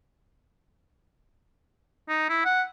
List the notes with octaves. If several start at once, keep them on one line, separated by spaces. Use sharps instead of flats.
D#4
E4
F#5